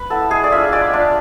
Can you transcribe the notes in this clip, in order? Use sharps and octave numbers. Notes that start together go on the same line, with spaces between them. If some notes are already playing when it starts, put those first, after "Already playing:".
Already playing: B4
B3 E4 A4
G#3 G#4
D5
D4 F4 E5
G#3 D5
D4 F4